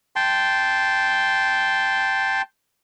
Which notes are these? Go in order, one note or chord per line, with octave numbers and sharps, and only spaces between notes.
G5 A5 C6